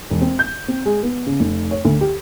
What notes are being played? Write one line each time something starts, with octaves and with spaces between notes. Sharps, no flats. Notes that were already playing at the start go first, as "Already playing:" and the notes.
E1
C4
G6
C4
G#3
B3
C#3
F1
C#5
D2
G4